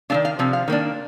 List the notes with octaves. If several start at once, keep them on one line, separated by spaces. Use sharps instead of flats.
D#3 A3 D4 F5
F5
C3 F3
F5
D#3 A#3 D4